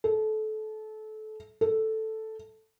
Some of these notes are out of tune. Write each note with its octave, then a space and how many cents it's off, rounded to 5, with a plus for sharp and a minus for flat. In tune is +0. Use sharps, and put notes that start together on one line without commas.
A4 -25
A4 +0